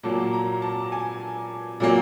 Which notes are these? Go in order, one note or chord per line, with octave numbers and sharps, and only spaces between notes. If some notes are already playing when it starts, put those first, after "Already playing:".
A#2 F#3 A#3 A5
A#5
A5
G#5
A#2 F#3 A#3